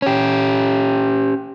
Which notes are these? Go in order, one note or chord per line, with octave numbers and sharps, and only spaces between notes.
C#4 G4